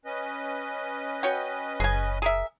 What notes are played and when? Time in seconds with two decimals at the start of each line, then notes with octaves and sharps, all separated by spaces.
0.05 C#4 B4 D#5
1.23 F#4 C#5 G5
1.80 F#1 G#4 G#5
2.22 G#4 A#4 E5